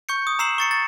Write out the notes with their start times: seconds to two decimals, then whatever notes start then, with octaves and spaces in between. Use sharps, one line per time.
0.09 C#6 G6 C#7
0.27 D#6
0.39 A#5 E6 C7 E7 F#7
0.58 C#6 A6 C#7
0.71 A6